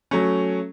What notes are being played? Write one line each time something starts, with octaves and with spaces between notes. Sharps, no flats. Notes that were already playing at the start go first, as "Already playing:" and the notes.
F#3 A3 C#4